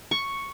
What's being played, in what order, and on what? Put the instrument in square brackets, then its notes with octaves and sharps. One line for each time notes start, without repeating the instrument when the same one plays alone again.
[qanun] C#6